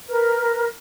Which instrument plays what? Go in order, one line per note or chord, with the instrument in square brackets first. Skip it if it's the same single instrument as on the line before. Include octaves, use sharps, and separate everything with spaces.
[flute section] A#4 B4